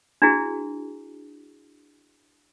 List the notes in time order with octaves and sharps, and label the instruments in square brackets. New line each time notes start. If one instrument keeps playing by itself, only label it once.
[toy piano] D4 E4 F#4 G#4